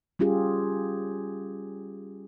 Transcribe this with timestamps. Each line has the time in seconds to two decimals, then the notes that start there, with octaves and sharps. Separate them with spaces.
0.19 G3 C#4 F4 G4 G#4